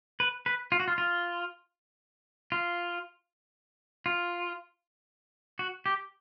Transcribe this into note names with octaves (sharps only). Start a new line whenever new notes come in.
B4
B4
F4
F#4
F4
F4
F4
F4
F#4
G4